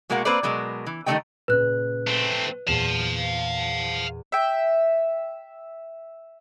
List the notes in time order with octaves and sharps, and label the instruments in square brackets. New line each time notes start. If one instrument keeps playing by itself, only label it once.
[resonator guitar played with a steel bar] B2 G#3 A#3 F#4 A#4 F#5
A#3 C4 B4 C5 D5
B2 F#3 G#3 A#4
E3
D#3 E3 G3 A3 D#5 G5
[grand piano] A#2 C#3 [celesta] B4 F#6
[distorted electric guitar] A3 C4
[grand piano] E2 A#2 [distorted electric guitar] F5 A5
[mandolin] E5 G5